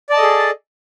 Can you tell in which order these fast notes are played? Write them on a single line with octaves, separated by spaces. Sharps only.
D5 A5 D#5 A4 G#4